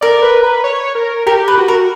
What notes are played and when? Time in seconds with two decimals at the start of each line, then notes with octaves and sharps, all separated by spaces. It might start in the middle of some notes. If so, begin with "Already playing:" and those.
0.01 A#4 D5
0.22 B4
0.43 B4
0.64 C#5
0.95 A#4
1.26 G4 A#4
1.48 B4
1.58 F#4
1.68 A#4